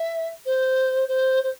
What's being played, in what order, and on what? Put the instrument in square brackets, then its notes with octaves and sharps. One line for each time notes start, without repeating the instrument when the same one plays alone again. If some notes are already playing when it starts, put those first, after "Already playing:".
Already playing: [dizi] E5
C5
C5
C5